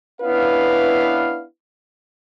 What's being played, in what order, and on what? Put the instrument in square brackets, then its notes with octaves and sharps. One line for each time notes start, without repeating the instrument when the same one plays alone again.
[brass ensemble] B3 C#4 D4 E4 B4 F5